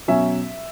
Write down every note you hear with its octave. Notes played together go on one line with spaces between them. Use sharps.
B2 F#3 C#4 E5